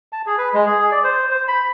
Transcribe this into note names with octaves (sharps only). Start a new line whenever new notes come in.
A5
G#4
B4
G#3
G#4
G#4
D5
C5
C5
B5